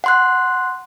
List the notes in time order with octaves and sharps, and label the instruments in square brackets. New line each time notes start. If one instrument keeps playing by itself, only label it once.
[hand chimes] F#5 C6 F#6